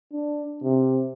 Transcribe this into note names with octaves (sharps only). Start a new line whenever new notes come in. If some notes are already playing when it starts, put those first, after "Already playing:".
D4
C3